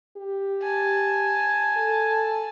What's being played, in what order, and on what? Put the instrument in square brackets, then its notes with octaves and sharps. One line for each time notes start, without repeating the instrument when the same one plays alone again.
[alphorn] G4
[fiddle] G#5 A5
[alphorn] A4